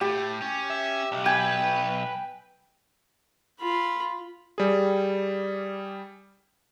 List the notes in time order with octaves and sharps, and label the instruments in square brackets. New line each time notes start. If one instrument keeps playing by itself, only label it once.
[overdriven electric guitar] A2 A3 [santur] G4
[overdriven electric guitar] C#4
[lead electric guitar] E5
B1
[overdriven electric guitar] B4 [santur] G5 G#5
[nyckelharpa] F4 B5
[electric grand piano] G3 G#4